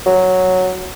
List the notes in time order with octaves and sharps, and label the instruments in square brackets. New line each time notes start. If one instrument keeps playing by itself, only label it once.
[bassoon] F#3